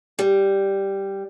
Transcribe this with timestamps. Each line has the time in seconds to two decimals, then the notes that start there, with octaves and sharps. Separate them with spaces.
0.19 G3